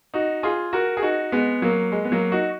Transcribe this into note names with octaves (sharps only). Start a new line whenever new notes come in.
D#4 F#4
F4 G#4
F#4 A#4
G#4
D#4 F#4
G#3 B3
F#3 A#3
G#3
B3
F#3 A#3
D#4 F#4